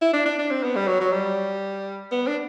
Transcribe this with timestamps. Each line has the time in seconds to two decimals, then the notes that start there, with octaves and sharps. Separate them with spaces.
0.02 E4
0.13 D4
0.26 D4
0.39 D4
0.50 C4
0.63 B3
0.75 G3
0.87 F#3
1.00 F#3
1.12 G3
2.11 B3
2.28 D4